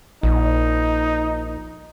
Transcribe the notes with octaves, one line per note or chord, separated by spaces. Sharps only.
A#1 D#4